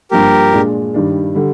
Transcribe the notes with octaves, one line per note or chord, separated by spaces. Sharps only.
G2 F3 A#3 G4 A#4
A#2 G#3 D4
G2 D#3 G3 D4
D3 G3